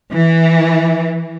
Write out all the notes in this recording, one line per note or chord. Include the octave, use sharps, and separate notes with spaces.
E3